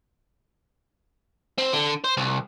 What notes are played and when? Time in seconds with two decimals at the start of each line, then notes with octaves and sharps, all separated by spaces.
1.59 C4
1.73 D3
2.04 C5
2.17 C2